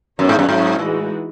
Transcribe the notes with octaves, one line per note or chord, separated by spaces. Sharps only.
F#2 B3 D#4 G#4 C#5
G#2
F#2
G#2 F#3 C#4 F#4 C#5
A2 E3 G#3 D#4 F#4